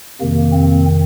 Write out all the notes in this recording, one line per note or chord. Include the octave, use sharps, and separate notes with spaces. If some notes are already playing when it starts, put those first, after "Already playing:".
F2 C3 D#3 A#3
C4